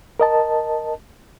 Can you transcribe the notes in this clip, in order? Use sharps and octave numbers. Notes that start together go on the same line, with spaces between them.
A#4 D#5 A5